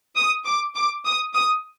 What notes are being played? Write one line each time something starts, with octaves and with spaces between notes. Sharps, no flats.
D#6
D6
D6
D#6
D#6